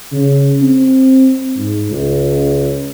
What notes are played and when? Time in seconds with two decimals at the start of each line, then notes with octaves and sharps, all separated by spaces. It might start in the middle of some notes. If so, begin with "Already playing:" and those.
0.12 C#3
0.62 C4
1.57 G#2
1.91 C#2